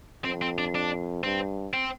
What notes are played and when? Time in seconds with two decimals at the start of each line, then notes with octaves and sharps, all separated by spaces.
0.24 F2 C4
0.42 C4
0.58 D4
0.75 D4
1.23 G2 C4
1.73 C4